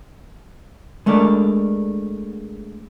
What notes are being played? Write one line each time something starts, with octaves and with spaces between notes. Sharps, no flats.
G#3 A3 D4 A#4 D5